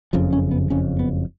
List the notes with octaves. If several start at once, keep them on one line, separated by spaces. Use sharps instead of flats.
F#1 F2 C#3 F3
C#4
B3
F#1 F2 C#3 C#4
B3